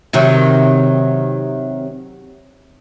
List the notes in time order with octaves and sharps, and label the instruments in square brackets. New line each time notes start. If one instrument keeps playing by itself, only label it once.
[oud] C3 D#3 F#3